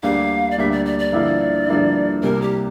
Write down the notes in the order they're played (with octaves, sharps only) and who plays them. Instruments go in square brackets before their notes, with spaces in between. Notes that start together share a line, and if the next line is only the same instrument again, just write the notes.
[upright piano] D2 D3 G3 A#3 D4 [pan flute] F5
[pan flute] D5
[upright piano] D2 D3 G3 A#3 D4 [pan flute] E5
[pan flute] D5
D5
D5
[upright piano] G2 D3 F3 A#3 E4
G2 D3 F3 A#3 E4
[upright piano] C2 C3 G3 A#3 [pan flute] A#4
[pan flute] G4